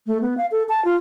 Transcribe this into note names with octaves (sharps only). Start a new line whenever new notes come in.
A3
B3
F5
A4
A5
F4